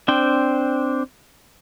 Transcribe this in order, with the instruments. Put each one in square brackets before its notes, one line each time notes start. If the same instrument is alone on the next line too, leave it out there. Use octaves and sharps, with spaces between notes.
[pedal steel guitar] C4 D4 C5 G5